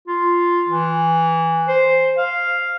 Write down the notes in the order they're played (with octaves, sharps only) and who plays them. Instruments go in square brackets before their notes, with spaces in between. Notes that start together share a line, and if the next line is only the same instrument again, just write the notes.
[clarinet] F4
E3
C5
F5